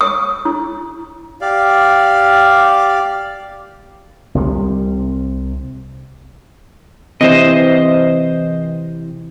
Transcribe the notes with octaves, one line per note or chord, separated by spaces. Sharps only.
D#6
E4
G4 D5 F5
C2 C3 G3
C3 E3 C5 D#5